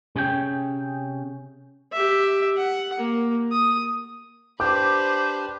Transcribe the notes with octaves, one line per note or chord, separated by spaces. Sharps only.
C3 C#4 G#4 C#5 G5
G4 E5
F#5
A#3
D#6
D4 G4 B4 C5 D6 G6